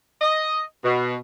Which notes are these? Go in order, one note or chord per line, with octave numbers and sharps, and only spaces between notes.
D#5
B2